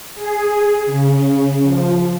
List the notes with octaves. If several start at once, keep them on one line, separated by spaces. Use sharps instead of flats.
G#4
C#3
F3